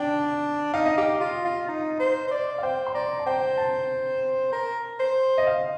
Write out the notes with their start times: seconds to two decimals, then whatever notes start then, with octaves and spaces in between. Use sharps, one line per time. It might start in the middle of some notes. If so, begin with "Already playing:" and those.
Already playing: D4 G5 A5
0.74 D#4 F5
0.85 D#5
0.98 G4 F5
1.20 F4
1.45 F4
1.68 D#4
2.00 C5
2.27 C5
2.31 D5
2.58 F5
2.63 C5 G5
2.86 C6
2.94 D5 A#5
3.19 A5
3.26 C5 G5
3.57 A5
4.53 A#4
5.00 C5
5.38 D#5
5.47 F5